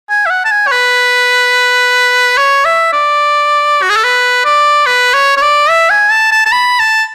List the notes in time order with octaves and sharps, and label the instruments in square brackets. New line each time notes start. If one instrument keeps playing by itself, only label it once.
[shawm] G#5
E5
F#5
A5
G#5
C#5
B4
C#5
E5
D5
F#4
G#4
A4
B4
D5
B4
C#5
C#5
D5
E5
G#5
A5
A5
A5
B5
A5